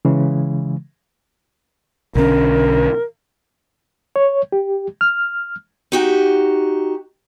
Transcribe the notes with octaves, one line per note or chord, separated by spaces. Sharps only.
C#3 E3 G#3
B1 D3 C#4 A#4
C#5
G4
F6
D#4 F#4 G4